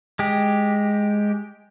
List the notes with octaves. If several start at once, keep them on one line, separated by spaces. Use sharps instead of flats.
G#3 G4